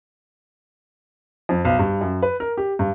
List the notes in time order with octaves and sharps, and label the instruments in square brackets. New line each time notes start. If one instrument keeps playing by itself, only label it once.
[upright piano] F2
B1
G2
F#2
B4
A#4
G4
G2